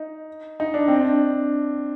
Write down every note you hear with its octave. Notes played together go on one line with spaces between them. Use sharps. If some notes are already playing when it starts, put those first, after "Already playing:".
Already playing: D#4
D#4
D4
C4
D4